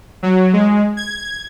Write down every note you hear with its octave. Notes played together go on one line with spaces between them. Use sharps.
F#3
G#3
G#6